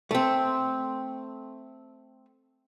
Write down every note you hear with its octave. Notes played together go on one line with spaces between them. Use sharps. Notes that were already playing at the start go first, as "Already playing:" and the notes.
A3 C4